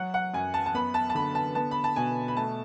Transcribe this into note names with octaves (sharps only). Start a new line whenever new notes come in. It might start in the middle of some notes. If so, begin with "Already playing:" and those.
Already playing: F#3 F#5
F#5
F#2 G#5
A5
A5
B3 B5
A5
A5
D3 B5
A5
B3 A5
B5
A5
B2 G#5
B5
A3 A5